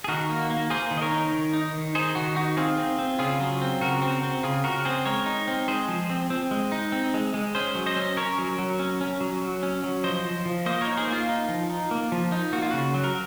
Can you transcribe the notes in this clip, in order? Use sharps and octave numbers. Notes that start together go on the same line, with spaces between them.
G#4
D#3 F#4 A#4
A#3
A#3
A#3 G#4 C5
D#3
D#5
A#4 C#5
D#4
D#3
D#4
D#3
D#4 G#4 C5
D#3 F#4
D#4 F#4
C4 F4 G#4
C4
C4
C#3 F4 G#4
F#3
C4
C#3 F#4 A#4
C4
C4
C#3 F4 G#4
C#3 F#4 A#4
C4 G#4 C5
G#3 A#4 C#5
D#4
C4
G#3 G#4 C5
F3
C4
C4
G#3
D#4
C4
G#3
G#3
C#4 G#4 C5
F#3
C5 D#5
C#4
C#4 A#4 C#5
F#3
F#3
C#4
C#4
F#3
F#3
C#4
F#3
F3 C5 D#5
F3
F3
A#3 C5 D#5
A#4 C#5
D#4
G#4 C5
A#3
F4
D#4
F3
D#4
A#3
F3
D#4
A#3 F#4
F4
C#3 F#4
F#3
A#4